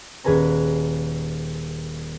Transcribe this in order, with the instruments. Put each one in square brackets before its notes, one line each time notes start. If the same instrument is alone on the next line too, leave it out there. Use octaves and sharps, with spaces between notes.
[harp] D#1 G#4 B4 G#5 A#5